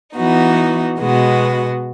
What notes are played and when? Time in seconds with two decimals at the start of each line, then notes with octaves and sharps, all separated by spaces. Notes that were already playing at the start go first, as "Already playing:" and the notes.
0.16 E3 B3 D#4 F#4
0.99 B2 G#3 B3 F#4